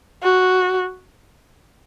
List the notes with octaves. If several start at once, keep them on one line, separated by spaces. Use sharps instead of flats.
F#4